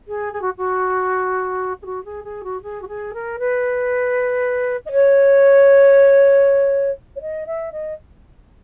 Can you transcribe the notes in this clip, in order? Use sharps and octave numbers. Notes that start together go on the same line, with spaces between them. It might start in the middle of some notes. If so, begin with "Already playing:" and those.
G#4
G#4
F#4
F#4
G#4
F#4
G#4
G#4
F#4
G#4
F#4
G#4
A#4
B4
D#5
C#5
C#5
D#5
E5
D#5